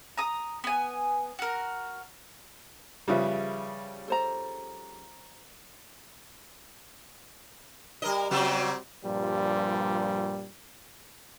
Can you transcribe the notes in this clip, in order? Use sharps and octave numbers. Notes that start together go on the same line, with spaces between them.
A#5 D#6
B3 G#5
F#4 A#4
C#3 F3 G3 G#4 B4 E5
A4 C5 A#5
G3 A#4 D#5
C#3 F#3 G3 C4 F#4
G2 A#2 F3 G3